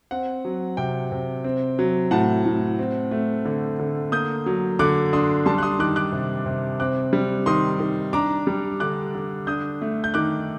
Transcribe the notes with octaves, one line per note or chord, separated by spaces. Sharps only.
C4 F#5
F#3
C3 G5
C3
C4
F#3
A2 F#5 A5
A2
C4
A3
D3
D3
A#3 D#6 G6
F#3
D3 D6 F#6
D4 C6 D#6
G3 A5 C6
F#6
C6 D#6
D#3 D6 F#6
D6 F#6
C3
C3
C4 D6 F#6
G3
D#3 C6 D#6
D#3
D4 A#5 D6
G3
D3 D6 F#6
D3
D4 D#6 G6
A3
G6
D#3 D6 F#6